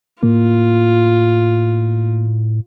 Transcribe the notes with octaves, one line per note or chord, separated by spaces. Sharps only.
A2 A#3 F4